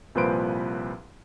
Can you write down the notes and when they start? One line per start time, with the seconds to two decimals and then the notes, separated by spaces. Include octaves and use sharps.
0.15 C2 A#2 F3 B4 C5 D7